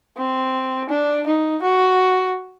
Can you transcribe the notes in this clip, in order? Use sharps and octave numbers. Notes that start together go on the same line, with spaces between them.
C4
D4
D#4
F#4